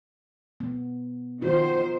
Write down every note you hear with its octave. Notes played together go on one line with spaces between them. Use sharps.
B3
D#3 F4 F#4 C5